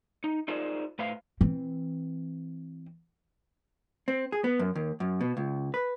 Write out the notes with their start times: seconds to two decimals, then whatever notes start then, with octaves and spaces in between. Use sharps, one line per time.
0.24 D#4
0.48 D#4 F4 G#4 A#4 C5 D5
0.99 A2 B4 C5 F5
1.41 E3 C4
4.08 C4
4.32 G#4
4.44 B3
4.59 F#2
4.75 D#2
5.00 F#2
5.21 B2
5.37 C#2
5.74 B4